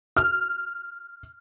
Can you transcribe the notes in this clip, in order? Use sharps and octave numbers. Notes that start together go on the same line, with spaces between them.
F6